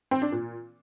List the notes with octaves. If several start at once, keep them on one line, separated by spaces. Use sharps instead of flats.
C4
D4
A#2